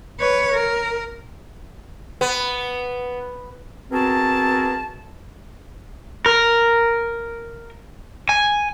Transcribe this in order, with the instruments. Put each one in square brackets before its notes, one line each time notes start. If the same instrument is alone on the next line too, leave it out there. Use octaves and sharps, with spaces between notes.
[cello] B4 C#5
A#4
[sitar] B3
[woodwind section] B3 C4 F#4 G#4 A#4 A5
[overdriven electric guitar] A#4
G#5